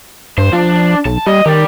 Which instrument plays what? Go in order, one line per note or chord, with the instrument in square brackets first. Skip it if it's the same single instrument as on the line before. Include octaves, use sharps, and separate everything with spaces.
[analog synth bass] G2 [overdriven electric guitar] C5
[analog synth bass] F3 [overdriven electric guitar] D4
[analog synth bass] B1 [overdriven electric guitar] A5
[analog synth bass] G3 [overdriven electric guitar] D#5
[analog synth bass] D#3 [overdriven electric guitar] G4 D5